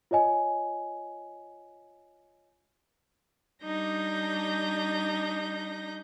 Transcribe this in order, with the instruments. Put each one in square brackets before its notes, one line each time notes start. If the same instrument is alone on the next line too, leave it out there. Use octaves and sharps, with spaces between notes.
[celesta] F4 C#5 D#5 G#5
[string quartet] G3 D4 D#4 G6 A#6